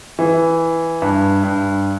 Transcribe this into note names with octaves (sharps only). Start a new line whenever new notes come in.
E3
G2
G2